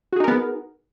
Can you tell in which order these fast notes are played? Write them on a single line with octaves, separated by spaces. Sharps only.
F#4 G#4 D#4 A#4 B3